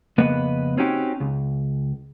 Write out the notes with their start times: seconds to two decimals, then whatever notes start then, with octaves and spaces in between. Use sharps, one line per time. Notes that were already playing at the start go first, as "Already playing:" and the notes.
0.18 F2 C#3 A#3 B3 B4 D#5
0.77 C4 C#4 D#4 F#4 G4
1.20 C#2